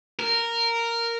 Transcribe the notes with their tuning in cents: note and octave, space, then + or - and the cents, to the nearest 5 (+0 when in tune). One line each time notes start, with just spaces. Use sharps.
A#4 -5